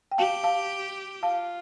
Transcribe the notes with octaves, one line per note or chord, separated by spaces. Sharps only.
G5
G4 F5 A5
F5 A5
F4 F5 A5